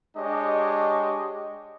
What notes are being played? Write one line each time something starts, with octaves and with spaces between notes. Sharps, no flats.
G#3 D4 G4 C#5 D#5